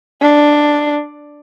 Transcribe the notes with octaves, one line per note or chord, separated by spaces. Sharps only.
D4